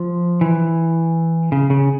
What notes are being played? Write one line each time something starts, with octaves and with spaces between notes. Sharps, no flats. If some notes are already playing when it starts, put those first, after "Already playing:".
Already playing: F3
E3
C#3
C#3